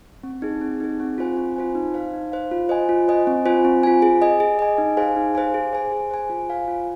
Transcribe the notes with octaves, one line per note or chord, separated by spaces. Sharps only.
C4
D#4 G#4
C4
D#4 G#4
C4
F4 C5 G#5
C4
F4 C5 G#5
D#4
C5 F5
D#4
C5 F5
F4
C5 D#5 G#5
F4
C5 D#5 G#5
C4
F4 C5 G#5
C4
F4 C5 G#5
G#4
D#5 G#5
G#4
D#5 G#5
D#4
G#4 C5 F5 G#5
D#4
G#4 C5 F5 G#5
G#4
C5 G#5
G#4
C5 G#5
F4
C5 F5 G#5
F4